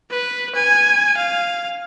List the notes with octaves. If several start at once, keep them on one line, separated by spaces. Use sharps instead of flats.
B4
G#5
F5